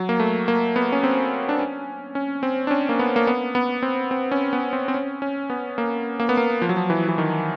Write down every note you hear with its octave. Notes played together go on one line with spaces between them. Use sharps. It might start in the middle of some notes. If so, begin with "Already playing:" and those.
Already playing: F#3
A#3
A3
A#3
B3
C#4
C4
D4
C#4
C#4
C4
D4
C#4
A#3
B3
A#3
B3
B3
C4
C4
C#4
B3
C4
C4
C#4
C#4
B3
A#3
A#3
B3
A#3
F3
F#3
F3
E3
E3
D#3